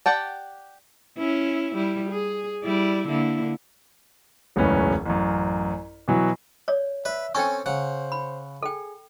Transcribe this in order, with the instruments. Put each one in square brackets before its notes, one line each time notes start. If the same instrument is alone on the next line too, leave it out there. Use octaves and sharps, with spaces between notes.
[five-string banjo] G4 D5 F#5 G5 A5
[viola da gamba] C#4 E4
G3 E4
G#4
G3 E4 D5
D3 A#3 E4
[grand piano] E1 C#2 F#2 A2 C#4 B4
A1 F#2
B2 E3 F#3
[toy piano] C#5 D5
[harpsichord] B4 [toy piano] D5 [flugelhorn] E5
[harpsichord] C4 C#4 A4 [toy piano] G5 C#6 [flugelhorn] G#5
[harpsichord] C#3 F#5 [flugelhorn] C5
[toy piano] B5
[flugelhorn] G#4 [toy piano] A4 G5